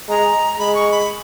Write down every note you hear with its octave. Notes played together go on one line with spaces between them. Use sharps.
G#3 A#5
G#3 B5
C#6
B5